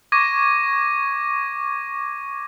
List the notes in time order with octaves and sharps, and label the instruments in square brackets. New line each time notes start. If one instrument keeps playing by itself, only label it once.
[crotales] C#6 D6 G#6 A#6 D#7